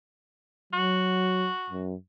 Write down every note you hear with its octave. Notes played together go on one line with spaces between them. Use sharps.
F#3 F#4
F#2